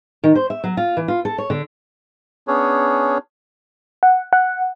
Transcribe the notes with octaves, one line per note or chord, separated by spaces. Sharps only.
D#3
C5
E5
F#3
F4
E3
F4
A4
C#5
D3
B3 C#4 D4 G#4 C#5
F#5
F#5